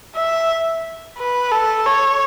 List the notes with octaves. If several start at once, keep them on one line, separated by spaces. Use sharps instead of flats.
E5
B4
A4
C#5